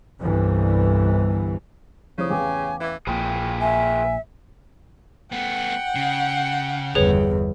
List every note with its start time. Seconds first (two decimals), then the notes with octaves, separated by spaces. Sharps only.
0.20 G1 C2 G2 E3
2.18 F1 C#3 E4 C5 D#6
2.30 A1 E2 B4 F5 G5 G#5 D6
2.80 E3
3.07 A#1 A#2 G#4 B4 G5
3.61 E5 G#5
5.32 A3 B3 F#5 G5
5.95 C#3
6.95 G1 E2 G#4 B4 C#5